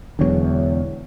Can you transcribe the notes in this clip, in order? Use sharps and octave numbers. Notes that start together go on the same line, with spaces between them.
E1 E2 D3 F#3 C#5